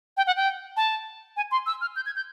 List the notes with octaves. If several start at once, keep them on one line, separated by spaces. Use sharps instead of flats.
G5
F#5
G5
A5
G#5
C6
E6
F6
G6
G#6
G6